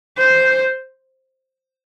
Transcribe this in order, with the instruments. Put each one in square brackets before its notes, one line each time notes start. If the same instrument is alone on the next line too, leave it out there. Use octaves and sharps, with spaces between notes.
[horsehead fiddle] C5